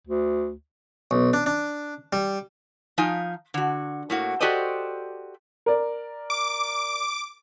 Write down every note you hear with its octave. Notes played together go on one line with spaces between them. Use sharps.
D2
B1
D4
D4
G3
F3 D#4 F5 G#5
D3 F#4
A2 A#3 F#4
F#4 G4 A4 C5 D5 D#5
A#4 D5
D6